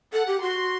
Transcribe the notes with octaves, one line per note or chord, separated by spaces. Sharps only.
A4 F#5
G4
F#4 C6